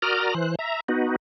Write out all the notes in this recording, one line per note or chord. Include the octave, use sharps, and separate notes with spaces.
F#4 A#4 D5 A#5 D#6 F6
E3 C5 F#6
E5 A#5
B3 D#4 F#4